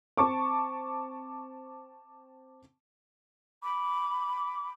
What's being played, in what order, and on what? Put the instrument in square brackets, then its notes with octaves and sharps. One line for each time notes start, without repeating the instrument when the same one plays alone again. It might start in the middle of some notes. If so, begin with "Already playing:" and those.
[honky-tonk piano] C4 A5 C#6 D6
[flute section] B5 D6